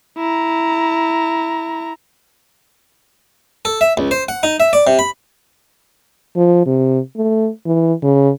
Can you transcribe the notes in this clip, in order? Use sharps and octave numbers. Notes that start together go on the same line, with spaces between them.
E4 A#5
A4
E5
C#2
C5
F#5
D#4
E5
D5
C3
B5
F3
C3
A3
E3
C#3